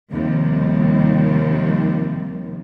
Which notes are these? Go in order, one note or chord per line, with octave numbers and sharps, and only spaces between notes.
D#2 C3 D#3 F3 G3